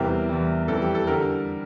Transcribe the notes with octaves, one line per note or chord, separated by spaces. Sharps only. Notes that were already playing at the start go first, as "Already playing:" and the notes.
Already playing: E2 C3 E3 G3 G4 A#4
E2 E3 G3
F2 E3 G3 A4
G4
A4
D3 G3 G4 A#4